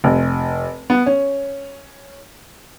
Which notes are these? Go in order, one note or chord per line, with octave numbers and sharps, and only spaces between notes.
F1
B3
C#4